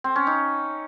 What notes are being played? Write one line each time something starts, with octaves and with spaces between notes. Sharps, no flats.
C4
C#4
D#4